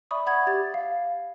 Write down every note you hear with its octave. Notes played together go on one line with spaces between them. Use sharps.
D5 E5 B5 C#6 D#6
F#5 B5 G#6
G4 A6
F5